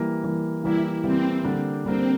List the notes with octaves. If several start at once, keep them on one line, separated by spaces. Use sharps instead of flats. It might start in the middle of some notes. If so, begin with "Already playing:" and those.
Already playing: E3 G3 A#3
E3 G3 A#3
E3 G3 A#3 E4
E3 G3 A#3 C4
D3 G3 A#3 D4
D3 G3 A#3 C4 D4